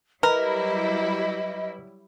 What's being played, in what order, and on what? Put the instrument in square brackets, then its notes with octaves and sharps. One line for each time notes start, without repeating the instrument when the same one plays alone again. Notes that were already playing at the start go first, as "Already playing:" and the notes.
[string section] F#3 G3 E4 [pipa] A#4 [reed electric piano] B4 [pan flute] D#5